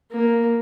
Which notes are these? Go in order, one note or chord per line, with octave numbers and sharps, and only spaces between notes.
A#3